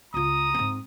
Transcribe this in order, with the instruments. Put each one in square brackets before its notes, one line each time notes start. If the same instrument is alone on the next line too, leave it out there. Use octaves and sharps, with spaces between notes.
[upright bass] C#2 F4 [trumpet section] A#5 D#6
[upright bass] G#2 C4